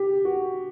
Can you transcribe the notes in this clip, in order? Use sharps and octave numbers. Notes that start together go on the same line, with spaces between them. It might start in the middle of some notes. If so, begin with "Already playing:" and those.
Already playing: G4
F#4